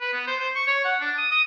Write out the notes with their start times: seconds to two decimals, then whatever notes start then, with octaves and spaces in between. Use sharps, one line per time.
0.01 B4
0.13 B3
0.27 C5
0.39 C5
0.55 C#6
0.67 C#5
0.85 F#5
1.01 D4
1.18 D#6
1.32 D#6